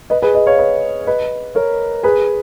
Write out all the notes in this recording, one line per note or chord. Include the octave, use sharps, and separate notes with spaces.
B4 D#5
G#4 B4
B4 D#5
C#5 F5
B4 D#5
B4 D#5
A#4 C#5
G#4 B4